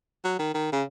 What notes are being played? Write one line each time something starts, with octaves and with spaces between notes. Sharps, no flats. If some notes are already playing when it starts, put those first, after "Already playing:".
F#3
D#3
D#3
C#3